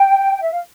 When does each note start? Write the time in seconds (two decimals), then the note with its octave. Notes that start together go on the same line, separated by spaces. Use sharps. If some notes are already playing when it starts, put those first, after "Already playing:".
Already playing: G5
0.41 E5
0.52 F5